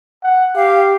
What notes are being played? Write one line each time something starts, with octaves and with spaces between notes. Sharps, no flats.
F#5
G4 F5